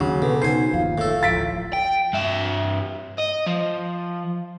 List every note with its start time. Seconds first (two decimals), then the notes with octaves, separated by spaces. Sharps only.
0.01 D#2 C#3 F#3
0.22 B2 D3 B4
0.42 D#4 C5 G#5 C7
0.73 G1 D#2 F3 F5
0.98 A2 A4
1.23 D1 A1 F3 A6 B6 D7
1.73 G5
2.13 G2 E5
3.18 D#5
3.46 F3